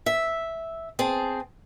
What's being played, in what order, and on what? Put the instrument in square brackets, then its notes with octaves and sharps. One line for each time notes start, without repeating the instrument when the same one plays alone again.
[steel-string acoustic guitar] E5
C4 G#4 A5